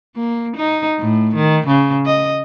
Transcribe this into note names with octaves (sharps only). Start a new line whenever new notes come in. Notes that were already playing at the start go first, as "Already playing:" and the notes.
A#3
D#4
A2
D#3
C#3
D#5